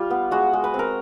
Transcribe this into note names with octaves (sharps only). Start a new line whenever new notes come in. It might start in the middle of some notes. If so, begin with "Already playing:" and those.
Already playing: G3 F4
B3
G#3 F#4
G#3
B4
C4
A#4